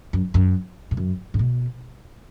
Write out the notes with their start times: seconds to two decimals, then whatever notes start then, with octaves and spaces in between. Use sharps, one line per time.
0.13 F#2
0.34 F#2
0.91 G#2
0.97 F#2
1.34 G#2
1.39 B2